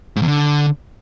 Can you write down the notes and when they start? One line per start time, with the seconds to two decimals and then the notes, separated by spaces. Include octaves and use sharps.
0.16 G#2
0.22 E2
0.28 D3